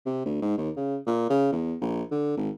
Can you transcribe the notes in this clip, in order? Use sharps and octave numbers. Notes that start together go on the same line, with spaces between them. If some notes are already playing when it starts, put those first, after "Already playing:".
C3
D2
G#2
D#2
C#3
A#2
C#3
E2
A#1
D3
G#1